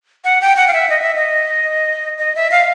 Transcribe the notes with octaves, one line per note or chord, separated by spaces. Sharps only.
F#5
G5
F#5
F5
E5
D#5
E5
D#5
D#5
E5
F5